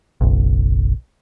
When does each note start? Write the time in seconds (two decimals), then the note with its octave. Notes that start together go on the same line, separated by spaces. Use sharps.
0.21 F#1 B1